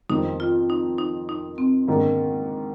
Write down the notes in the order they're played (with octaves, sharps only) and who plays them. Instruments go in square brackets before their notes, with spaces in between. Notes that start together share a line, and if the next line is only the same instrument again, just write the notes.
[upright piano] F2 D#3 G3 C4 [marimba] D#4
[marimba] F4
D#4
D#4
D#4
C4
[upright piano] G#2 D#3 A#3 D4